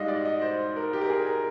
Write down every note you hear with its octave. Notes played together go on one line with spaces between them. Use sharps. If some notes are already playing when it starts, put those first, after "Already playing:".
Already playing: G#2 G3 D#5 F5
D5
D#5
C5
A#4
G4
A#4
G#4
A#4